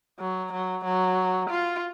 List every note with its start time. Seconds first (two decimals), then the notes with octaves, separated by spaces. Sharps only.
0.20 F#3
0.53 F#3
0.84 F#3
1.50 F4